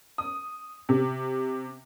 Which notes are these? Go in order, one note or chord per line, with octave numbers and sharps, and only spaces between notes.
D#6
C3